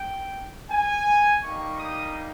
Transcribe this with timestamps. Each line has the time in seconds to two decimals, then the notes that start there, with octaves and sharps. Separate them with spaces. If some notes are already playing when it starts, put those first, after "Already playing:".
Already playing: G5
0.70 G#5
1.43 G3 A#3 D#4 G4 C#6
1.78 D#6